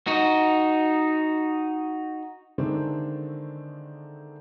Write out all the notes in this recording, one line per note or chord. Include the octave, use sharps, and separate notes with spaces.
D#4 F#4
D3 D#3 G#3 A3 C4 D4